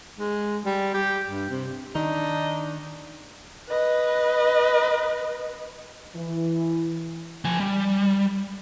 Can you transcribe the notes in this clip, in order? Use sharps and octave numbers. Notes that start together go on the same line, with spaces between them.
G#3
G3
G4
G2
C3
D#3 D4 D#4
B4 D#5
E3
F3 G#5
G3